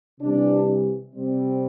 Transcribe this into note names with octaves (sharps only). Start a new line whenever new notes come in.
C3 E3 G3 D4
C3 G3 C4